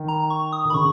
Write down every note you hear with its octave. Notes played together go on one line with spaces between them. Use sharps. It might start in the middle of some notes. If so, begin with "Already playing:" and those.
Already playing: D#3
A#5
C#6
D#6
D#3
B5
C#3 C#6